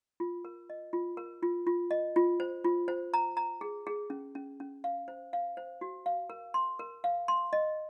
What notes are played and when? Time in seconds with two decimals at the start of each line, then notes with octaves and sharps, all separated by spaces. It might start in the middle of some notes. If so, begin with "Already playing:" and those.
0.20 F4
0.45 A#4
0.70 D#5
0.93 F4
1.17 A#4
1.43 F4
1.67 F4
1.91 D#5
2.16 F4
2.40 C5
2.64 F4
2.88 C5
3.14 A#5
3.37 A#5
3.61 G#4
3.87 G#4
4.10 C#4
4.35 C#4
4.60 C#4
4.84 F5
5.08 C5
5.33 F5
5.57 C5
5.81 F#4
6.06 F5
6.30 A#4
6.54 C6
6.79 A#4
7.04 F5
7.28 C6
7.53 D#5